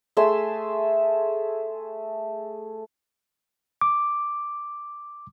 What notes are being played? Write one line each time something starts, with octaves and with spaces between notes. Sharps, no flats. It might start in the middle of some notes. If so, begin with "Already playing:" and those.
A3 G#4 E5 C6
D6